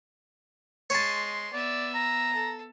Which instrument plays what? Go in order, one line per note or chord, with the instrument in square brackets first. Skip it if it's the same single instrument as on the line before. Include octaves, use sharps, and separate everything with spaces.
[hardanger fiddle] G#3 C6 [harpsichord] C#5 A5
[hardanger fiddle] B3 E5 [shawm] D5
[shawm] A#5
[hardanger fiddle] A4